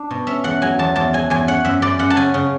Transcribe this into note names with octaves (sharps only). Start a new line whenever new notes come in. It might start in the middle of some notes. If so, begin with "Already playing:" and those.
Already playing: D4
B2
C#4 E5
E2 F#5
F#3 G#5
E2 A5
E2 A5
F#3 G#5
E2 G#5
C#4 F#5
F#2 E5
F#2 D5
F#2 F#5
A5
C#3 G#5
C#3